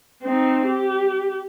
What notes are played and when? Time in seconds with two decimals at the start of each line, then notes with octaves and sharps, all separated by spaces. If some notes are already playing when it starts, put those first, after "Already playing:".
0.23 C4 D#4
0.66 G4